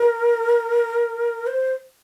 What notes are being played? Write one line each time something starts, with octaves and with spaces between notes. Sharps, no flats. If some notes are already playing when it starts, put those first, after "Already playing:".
Already playing: A#4
C5